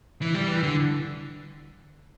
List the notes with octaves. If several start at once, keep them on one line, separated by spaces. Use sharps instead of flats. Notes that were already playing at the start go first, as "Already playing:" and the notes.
E3
G3
E3
D3